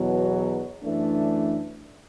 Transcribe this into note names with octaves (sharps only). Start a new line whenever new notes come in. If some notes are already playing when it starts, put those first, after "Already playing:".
Already playing: E2 B2 F#3
F#2 E3 A3 D4